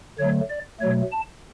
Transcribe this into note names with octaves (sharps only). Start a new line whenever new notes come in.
D3 F#3 A3 C#5
D5
B2 F#3 A3 C#5
A5